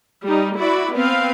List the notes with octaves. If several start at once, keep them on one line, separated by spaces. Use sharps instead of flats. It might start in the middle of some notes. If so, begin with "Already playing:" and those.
G3 D#4
E4 F#4 D5 B5
B3 C4 B4 F5